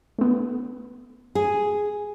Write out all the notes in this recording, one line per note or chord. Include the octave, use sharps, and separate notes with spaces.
A3 B3
G#4